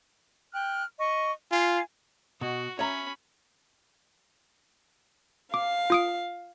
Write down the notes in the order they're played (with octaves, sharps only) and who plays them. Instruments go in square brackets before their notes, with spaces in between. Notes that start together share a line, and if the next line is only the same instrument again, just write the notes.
[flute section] G5 F6 F#6
D#5 C#6
[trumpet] F4 [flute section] F5 G#5
[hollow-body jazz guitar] B2 [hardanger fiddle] F#4
[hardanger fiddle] C#4 B5 [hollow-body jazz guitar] C#5 E5 A#5
[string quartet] F5 [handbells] D6
[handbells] F4 D#6 D7